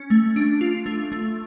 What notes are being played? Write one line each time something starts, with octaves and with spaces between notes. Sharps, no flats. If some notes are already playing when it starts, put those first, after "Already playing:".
Already playing: C#4
A3
D4
F4
A3
A3